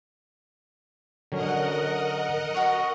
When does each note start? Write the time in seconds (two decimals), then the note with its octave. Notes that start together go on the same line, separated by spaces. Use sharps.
1.32 D3 F#3 C#4 A#4 D#5 F#5
2.54 F#4 C#5